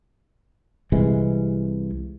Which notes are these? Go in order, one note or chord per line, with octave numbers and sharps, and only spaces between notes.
C2 C3 E3 G#3